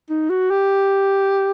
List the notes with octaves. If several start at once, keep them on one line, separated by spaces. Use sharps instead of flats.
D#4
F#4
G4